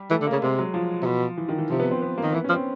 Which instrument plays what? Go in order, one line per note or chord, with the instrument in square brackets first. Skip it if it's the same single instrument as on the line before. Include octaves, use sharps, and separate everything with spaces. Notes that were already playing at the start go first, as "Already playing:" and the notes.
Already playing: [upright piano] G3
[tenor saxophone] E3 [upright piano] A3
[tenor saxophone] D3
[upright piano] A#3
[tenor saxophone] C#3
[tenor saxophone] C3 [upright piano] G#3
[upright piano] F#3
F3
[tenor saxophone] C3
B2
[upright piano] E3
D#3
E3
[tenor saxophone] C3 [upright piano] F3
[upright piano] B3
C4
B3
A#3
[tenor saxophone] D#3
[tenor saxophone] E3 [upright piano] B3
[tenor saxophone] F3 [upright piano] C#4
[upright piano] C4